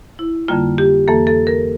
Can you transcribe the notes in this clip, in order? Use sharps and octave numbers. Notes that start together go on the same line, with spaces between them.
E4
F2 D3 G3 A#3 F4
G4
F2 E3 A#3 A4
A4
A#4